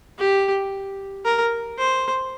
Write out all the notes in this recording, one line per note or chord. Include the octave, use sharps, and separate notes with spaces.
G4
A#4
C5